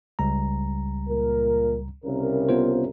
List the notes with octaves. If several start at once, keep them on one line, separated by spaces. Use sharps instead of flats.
C#2 G3 A#5
A#2 A#4
C2 C#3 A#4
B3 F4 C5